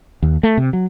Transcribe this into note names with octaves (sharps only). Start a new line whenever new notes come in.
D#2
A3
C3
F#3